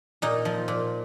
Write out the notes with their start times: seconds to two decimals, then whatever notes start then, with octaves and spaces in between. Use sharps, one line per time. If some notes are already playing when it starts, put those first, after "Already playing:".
0.22 A#2 D#4
0.45 F3
0.68 A#2